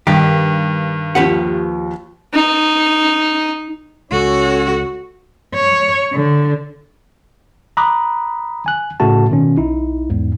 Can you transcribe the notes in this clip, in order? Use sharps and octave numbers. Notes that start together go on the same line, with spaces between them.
G2 D#3 G4
D#2 F3 G4 B4 F#5
D#4
C#2 C#4 F#4 A4 C#5
C#5
D3
A#5 B5 D6 D#6 F#6
G#5 F#6
A2 C#3 A3 F#4 A5
B2 D#3 C#4
B1 D#4 E4
E2 G#2